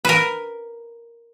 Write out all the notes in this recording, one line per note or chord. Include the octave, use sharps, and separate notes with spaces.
A#4 B4